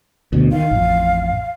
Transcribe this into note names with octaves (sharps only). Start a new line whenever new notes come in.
D2 B2
D#3 F5
A1 F2